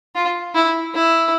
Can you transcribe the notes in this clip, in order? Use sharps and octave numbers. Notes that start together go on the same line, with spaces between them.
F4
E4
E4